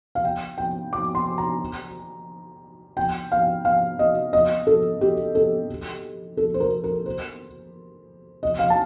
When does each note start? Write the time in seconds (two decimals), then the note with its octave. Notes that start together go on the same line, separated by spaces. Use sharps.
0.15 F5
0.25 G5
0.58 G5
0.93 D6
1.15 C6
1.38 A#5
2.97 G5
3.32 F5
3.65 F5
3.99 D#5
4.33 D#5
4.67 A4
5.01 G4
5.35 A4
6.37 A4
6.54 C5
6.60 A#4
6.84 A#4
7.06 C5
8.43 D#5
8.59 F5
8.70 A5